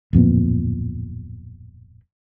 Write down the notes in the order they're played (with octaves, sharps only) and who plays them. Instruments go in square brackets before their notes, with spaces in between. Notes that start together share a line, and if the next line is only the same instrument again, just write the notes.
[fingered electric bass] D1 F2 A#2 B3